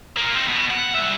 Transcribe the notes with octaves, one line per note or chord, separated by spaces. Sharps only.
A#3 F4
C4 D#4
B2 B3
F#5
G3 E5